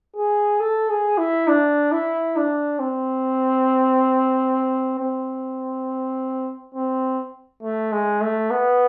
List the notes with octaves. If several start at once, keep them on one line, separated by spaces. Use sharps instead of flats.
G#4
A4
G#4
E4
D4
E4
D4
C4
C4
C4
A3
G#3
A3
B3